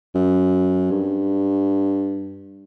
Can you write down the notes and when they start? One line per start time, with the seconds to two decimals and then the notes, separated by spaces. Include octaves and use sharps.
0.15 F#2
0.91 G2